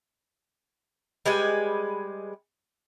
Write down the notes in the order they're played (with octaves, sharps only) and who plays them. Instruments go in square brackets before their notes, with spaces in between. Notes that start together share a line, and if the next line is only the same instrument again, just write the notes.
[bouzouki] G3 G#3 B4 G#5